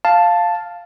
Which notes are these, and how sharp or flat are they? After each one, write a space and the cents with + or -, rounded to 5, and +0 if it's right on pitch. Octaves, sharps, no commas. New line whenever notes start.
F5 +0 A5 +0